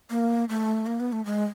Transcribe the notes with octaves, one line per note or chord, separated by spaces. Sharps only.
A#3
A3
A#3
B3
A3
G#3